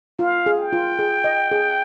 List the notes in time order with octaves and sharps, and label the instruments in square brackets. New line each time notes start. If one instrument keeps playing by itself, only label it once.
[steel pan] F4 [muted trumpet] F5
[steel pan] G#4
[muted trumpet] G5
[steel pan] F4
G#4
D#5
G#4